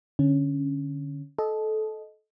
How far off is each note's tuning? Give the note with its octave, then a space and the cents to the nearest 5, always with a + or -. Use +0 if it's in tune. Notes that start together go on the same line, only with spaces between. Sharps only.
D3 +0 C#4 +0
A4 -20 D#5 +0